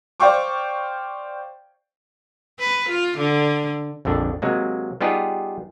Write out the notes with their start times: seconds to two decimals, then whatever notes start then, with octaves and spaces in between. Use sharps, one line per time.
0.20 C5 D5 F5 G5 C#6 D6
2.60 B4
2.90 F4
3.18 D3
4.05 A#1 F2 D3 D4
4.42 C3 F#3 G#3 A#3
5.01 G3 B3 D#4 F4 G4 G#4